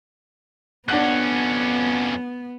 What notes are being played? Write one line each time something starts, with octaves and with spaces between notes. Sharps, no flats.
F2 B3 C#4 D4 F#5 F#6